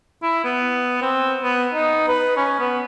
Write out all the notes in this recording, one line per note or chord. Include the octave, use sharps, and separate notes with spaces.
E4
B3
C4
B3
D#4
B4
C#4
B3